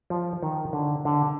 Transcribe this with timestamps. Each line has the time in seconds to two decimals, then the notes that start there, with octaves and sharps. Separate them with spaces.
0.10 F3
0.43 D#3
0.73 D3
1.05 D3